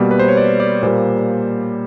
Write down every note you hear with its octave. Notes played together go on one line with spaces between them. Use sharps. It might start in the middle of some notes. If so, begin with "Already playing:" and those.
Already playing: B2 G3 A#3
B4
C5
C#5
D5
D5
A#2 G3 A#3 C5